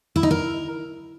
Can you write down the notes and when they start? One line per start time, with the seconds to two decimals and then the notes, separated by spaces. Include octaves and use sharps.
0.16 E4
0.23 D#4
0.31 A#4